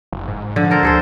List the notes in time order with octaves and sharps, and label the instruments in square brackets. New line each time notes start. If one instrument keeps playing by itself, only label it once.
[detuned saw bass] F#1
G#2
[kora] D3 [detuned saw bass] F3
[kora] A4 A#4 C5
[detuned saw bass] D2 [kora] G#4 A4 C5